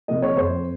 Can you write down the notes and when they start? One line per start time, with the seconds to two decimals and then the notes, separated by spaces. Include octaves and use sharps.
0.08 C3 F3 A#3 D#5
0.22 C#5
0.37 F2 C5